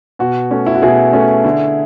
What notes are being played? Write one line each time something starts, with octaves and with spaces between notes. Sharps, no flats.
B2 F#4
A3 C#4
E4
F#4
B2 E4 G#4
A3 C#4
D3